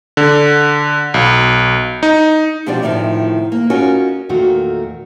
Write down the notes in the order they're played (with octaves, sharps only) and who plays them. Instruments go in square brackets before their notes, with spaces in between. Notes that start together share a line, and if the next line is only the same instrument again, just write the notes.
[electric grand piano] D3
B1
D#4
[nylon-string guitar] B2 F3 C4 D4 G4 D5
D2 A2 C3 D#3 F3
A#3
C#4 D#4 F4 F#4 A#4 C#5
[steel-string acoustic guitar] E2 A#2 D#3 A3 F#4 A#4